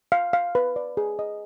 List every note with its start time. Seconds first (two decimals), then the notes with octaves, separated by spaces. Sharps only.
0.12 F5
0.33 F5
0.55 B4
0.76 D5
0.97 G#4
1.19 D#5